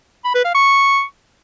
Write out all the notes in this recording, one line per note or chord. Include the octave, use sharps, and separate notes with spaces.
B5
B4
F5
C#6